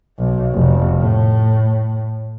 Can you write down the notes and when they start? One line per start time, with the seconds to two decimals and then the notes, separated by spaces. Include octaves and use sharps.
0.19 B1
0.54 F1
0.99 A2